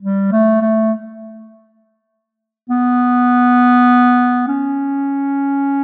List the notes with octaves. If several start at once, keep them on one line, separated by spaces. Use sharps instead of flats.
G3
A3
A3
B3
C#4